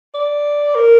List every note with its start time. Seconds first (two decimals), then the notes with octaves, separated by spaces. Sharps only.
0.15 D5
0.75 A#4